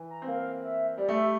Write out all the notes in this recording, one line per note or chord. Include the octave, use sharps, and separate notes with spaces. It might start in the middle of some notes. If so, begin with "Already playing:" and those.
Already playing: E3
A#5
C4
A#3 F5
E5
G3 D5
A3
E5
G3